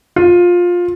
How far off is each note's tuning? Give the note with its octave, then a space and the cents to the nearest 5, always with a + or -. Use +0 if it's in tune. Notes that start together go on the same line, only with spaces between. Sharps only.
F4 +15